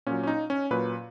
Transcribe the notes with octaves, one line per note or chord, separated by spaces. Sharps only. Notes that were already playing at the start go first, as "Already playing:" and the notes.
A#2 F#3 C#4
C#4
D#4
C#4
A#2 F#3 B4